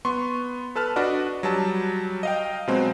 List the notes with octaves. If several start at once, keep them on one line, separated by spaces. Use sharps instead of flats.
B3 C6 C#6
A4 B4 A5 F6
D4 F#4 B4 D5 D#5
F#3 G3 A5
D#5 F5 G5
B2 F#3 G#3 C4